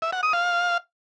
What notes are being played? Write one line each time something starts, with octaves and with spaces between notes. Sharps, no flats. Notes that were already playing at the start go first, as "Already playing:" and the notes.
E5
F#5
D#6
F5